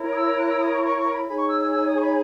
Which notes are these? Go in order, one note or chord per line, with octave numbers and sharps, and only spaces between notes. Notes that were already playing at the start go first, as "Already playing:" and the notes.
Already playing: E4 A#4 C#5
D#6
E6
F#6
E6
D#6
C#6
C#6
C#6
B5
D#4 G#4 C#5 B5
C#6
E6
E6
E6
D#6
C#6
B5